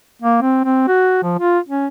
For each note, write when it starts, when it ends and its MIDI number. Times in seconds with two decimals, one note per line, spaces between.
0.22 0.39 58
0.42 0.61 60
0.65 0.85 60
0.88 1.20 66
1.23 1.36 53
1.39 1.59 65
1.69 1.87 61